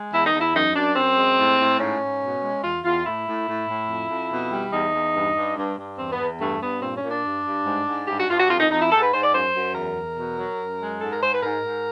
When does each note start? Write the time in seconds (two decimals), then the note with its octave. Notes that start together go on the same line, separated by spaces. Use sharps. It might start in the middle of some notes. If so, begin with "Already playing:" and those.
Already playing: G#3
0.12 E2 E4
0.26 D#4
0.33 E2
0.40 E4
0.54 F#2 D#4
0.75 F#2 D4
0.95 F#2 C4
1.17 G#3
1.38 A2
1.59 A2
1.80 G#2 C#4
2.01 G#2
2.22 B2
2.43 G#3
2.63 E2 F4
2.84 E2 F4
3.06 A2 E4
3.27 A2
3.47 A2
3.68 A2
3.89 F2
4.10 F2
4.31 B2
4.51 G3
4.73 E2 D#4
4.94 E2
5.14 G2
5.36 G2
5.57 G2
5.78 G2
5.98 E2 C4
6.12 B3
6.20 E2
6.40 G2 A3
6.61 G2 B3
6.82 A#2 C4
6.96 C#4
7.03 A#2
7.10 D4
7.25 G2
7.45 G2
7.66 G#2
7.87 G#2
8.07 G2 G4
8.19 F#4
8.29 G2 F4
8.40 F#4
8.50 F2 F4
8.60 D#4
8.71 F2 D#4
8.81 E4
8.92 G#2 A4
9.02 B4
9.12 G#2 C5
9.23 D5
9.34 F#2 C5
9.54 F#2
9.75 E2 A#4
9.96 E2
10.17 B2
10.38 F#3
10.59 F#2
10.80 G#3
11.01 G#2 A4
11.12 A#4
11.22 G#2 C5
11.32 B4
11.43 G#2 A#4
11.64 G#2